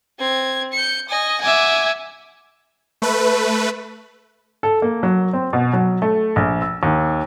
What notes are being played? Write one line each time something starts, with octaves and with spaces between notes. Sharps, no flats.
C4 G#6
G6 C#7
D#5 G#5
E5 F#5 G#5 D6
A3 B4
A4
A#3
F#3
C4
B2
F#3
A3
A#1
E6
D#2